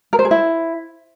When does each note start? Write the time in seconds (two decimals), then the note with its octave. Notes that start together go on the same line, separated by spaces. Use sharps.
0.13 A#4
0.19 C5
0.25 G#4
0.31 E4